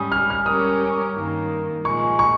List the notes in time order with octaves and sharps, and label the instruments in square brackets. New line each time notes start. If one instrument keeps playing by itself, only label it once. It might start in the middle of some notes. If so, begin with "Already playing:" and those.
Already playing: [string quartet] G#2 G3 C#4 [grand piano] D#6
[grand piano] F6
F6
[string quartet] G3 C#4 G4 A#4 C#5 [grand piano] D#6
[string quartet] G2 D#3 A#3
[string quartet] A#2 F3 G#3 [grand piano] C#6
[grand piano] C#6